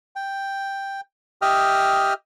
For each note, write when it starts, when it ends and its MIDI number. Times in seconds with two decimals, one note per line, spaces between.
0.16 1.01 79
1.42 2.14 67
1.42 2.14 75
1.42 2.14 76
1.42 2.14 79
1.42 2.14 87
1.42 2.14 89